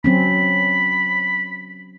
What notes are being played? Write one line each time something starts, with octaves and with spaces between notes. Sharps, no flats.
F#3 C4 C#4 B5